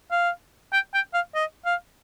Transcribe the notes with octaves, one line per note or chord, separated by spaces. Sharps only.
F5
G5
G5
F5
D#5
F5